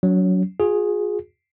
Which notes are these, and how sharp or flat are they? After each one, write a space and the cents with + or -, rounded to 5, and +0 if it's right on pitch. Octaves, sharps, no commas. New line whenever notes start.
F#3 +0 C#4 +45
F4 +45 G#4 +0